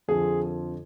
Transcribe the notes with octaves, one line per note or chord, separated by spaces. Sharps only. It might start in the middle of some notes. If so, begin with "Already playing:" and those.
F2 D3 F3 G#4